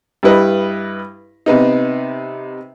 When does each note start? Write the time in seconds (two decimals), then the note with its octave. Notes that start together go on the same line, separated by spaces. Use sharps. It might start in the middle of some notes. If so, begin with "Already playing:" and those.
0.23 G2 G3 E4 B4 D#5
1.46 C3 B3 D#4